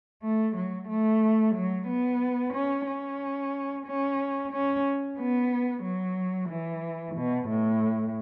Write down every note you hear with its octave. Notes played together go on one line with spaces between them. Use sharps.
A3
F#3
A3
F#3
B3
C#4
C#4
C#4
C#4
B3
F#3
E3
B2
A2